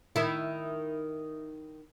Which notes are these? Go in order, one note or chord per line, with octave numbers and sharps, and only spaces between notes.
D#3 E4